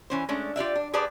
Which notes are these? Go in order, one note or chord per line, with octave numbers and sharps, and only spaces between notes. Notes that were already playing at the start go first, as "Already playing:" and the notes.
E3 C#4 C5
G#3 A3 C#4 D4
F4 G4 D5 E5
D4
G4 G#4 B4 C5 D5 A5